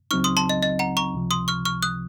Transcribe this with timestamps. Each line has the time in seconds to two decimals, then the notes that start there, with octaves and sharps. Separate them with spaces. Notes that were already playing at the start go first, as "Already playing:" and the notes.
0.11 C#2 C#3 F#3 C4 D#4 C#6 F6
0.24 C6 D#6
0.37 A5 C6
0.49 D#5
0.62 D#5
0.79 F#5 A#5
0.97 A#5 C#6
1.14 C#2 C3 F3
1.31 C6 D#6
1.48 C#6 F6
1.65 C#6 F6
1.83 D#6 F#6